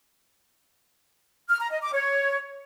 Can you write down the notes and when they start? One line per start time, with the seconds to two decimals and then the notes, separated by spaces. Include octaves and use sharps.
1.50 F6
1.61 A#5
1.72 D#5
1.83 D6
1.94 C#5